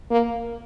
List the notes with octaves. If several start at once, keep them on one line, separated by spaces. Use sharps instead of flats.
A#3